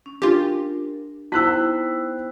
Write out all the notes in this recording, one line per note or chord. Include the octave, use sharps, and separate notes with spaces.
C#4
D4 F4 G4 A#4
B3 D#4 E4 C5 G5 E6 F#6 B6